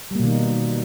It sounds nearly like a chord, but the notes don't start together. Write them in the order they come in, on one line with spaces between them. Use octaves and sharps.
G3 A#3 B2 D#3 D#4